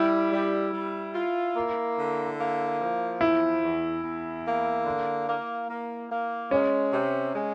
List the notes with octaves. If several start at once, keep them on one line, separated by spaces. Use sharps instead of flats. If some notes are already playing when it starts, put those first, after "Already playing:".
Already playing: G3 E4
G3
G3
F4
A#3
D3
A#3
F3
E2 E4
E2
E2
A#3
D3
A#3
A#3
A#3
G#3 C#4
C3
G#3